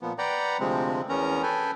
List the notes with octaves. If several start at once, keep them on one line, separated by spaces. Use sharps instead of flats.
A#2 F3 B3
B4 D5 F#5 G5 A#5
D2 C3 F3 G#3 C4
E2 B3 C#4 A#4 A#5
A4 B4 G5 G#5